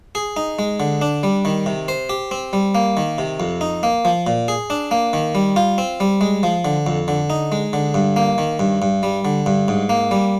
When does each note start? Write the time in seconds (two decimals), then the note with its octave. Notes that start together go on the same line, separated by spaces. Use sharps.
0.15 G#4
0.37 D#4
0.59 G#3
0.80 D3
1.01 D4
1.23 G3
1.45 D#3
1.66 C3
1.88 C5
2.09 G4
2.31 C4
2.53 G3
2.75 A#3
2.97 D#3
3.18 C3
3.40 F2
3.61 D#4
3.83 A#3
4.05 F3
4.27 A#2
4.48 G#4
4.70 D4
4.91 A#3
5.13 D#3
5.35 G3
5.56 F4
5.78 C4
6.00 G3
6.21 G#3
6.43 F3
6.65 D3
6.87 F2
7.08 D3
7.30 D#4
7.52 G#3
7.73 D3
7.94 G2
8.16 A#3
8.38 D#3
8.59 G2
8.82 G2
9.03 G3
9.25 D3
9.46 G2
9.68 G#2
9.89 A#3
10.11 G3